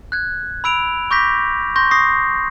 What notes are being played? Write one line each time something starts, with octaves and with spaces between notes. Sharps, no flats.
F#6 G#6
B5 E6 D7 F7
C#6 D6 G6 A#6 B6
C6 C#6 G6 A#6
C#6 D#6 A#6 C7